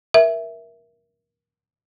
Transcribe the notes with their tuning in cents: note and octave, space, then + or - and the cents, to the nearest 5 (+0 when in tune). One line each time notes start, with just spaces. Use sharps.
A#4 +20 E5 +0